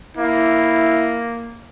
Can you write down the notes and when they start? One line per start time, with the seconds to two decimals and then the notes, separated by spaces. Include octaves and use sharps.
0.17 A#3 E4